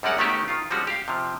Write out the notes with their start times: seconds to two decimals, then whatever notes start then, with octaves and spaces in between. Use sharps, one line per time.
0.03 F#2 G3 G#3 D5 F#5 A#5
0.18 D#3 A3 B3 C#4 F#4 G4
0.48 D#3 F4
0.71 F3 G3 G#3 C#4 F#4
0.87 G4 F5
1.08 C3 F3